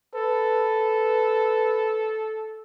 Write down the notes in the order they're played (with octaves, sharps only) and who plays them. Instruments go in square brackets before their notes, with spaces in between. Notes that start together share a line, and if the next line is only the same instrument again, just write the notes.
[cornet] A4 [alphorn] B4